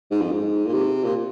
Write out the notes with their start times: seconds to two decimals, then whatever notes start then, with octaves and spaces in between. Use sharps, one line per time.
0.11 G#2
0.21 F2
0.32 G#2
0.66 A#2
0.73 C3
1.04 A#2